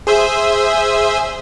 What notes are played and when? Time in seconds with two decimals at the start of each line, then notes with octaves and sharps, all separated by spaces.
0.07 G#4 C5 E5